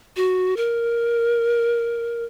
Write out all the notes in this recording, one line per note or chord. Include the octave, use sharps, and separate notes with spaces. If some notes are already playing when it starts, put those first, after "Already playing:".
F#4
A#4